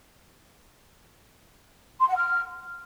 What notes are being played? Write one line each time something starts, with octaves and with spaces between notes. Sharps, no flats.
C6
F#5
F6